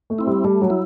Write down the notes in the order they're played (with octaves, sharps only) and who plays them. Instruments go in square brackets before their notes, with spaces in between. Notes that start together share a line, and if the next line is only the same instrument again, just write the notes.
[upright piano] A3
[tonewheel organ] C4 E4
[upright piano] G3
[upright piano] G3 [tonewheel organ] A3
[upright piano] F#3
[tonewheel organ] E4